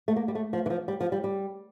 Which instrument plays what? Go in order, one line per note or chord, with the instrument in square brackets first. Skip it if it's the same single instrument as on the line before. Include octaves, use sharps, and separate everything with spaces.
[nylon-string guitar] A3
A#3
G3
A3
F3
E3
F3
G3
F3
G3
G3